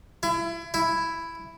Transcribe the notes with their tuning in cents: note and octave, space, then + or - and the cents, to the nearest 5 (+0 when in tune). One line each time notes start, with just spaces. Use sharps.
E4 +30
E4 +5